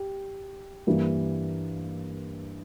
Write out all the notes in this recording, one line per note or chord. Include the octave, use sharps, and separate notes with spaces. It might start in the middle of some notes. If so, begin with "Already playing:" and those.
Already playing: G4
G2 E3 G3 A#3